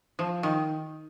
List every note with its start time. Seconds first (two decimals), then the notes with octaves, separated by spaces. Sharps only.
0.19 F3
0.43 D#3